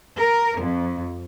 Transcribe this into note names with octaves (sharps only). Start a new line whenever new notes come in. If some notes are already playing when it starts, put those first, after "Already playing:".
A#4
F2